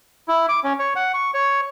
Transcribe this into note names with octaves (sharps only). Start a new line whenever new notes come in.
E4
D6
C#4
C#5
F#5
C#6
C#5